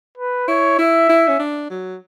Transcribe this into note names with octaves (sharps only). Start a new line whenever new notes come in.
B4
E4 C#5
E4 E5
E4
C#4
D4
F#3